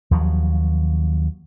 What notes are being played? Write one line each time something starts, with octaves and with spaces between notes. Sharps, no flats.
D#2 F3 F#3